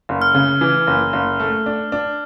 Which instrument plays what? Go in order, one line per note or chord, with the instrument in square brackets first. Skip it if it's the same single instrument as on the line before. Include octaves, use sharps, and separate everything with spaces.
[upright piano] F#1
[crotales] F6
[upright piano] C#3
E3
F#1
F#1
A3
D4
D4